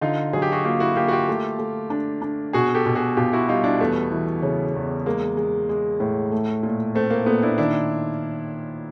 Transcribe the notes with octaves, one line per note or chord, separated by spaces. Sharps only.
D3 D#4 F4
F#3 G#4
G4
F#4 G#4
A#3 F4 G4
E4 F#4
A#3 F4 G4
F#4
F4 G4
A3
A3
D4
D4
B2 F#4 G#4
G4 A4
B2
F#4 G#4
B2 F4 G4
E4 F#4
G3 D#4 F4
D4 E4
E2 A3 B3
E3
C#3
E2
G#3 A#3
G#3
G#3
A2
A3
A#2
A3 C4
A#3
A#2 A3 B3
D4 E4
D#3 D4 E4